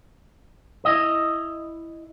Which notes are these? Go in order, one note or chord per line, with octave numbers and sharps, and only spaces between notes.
E4 D#5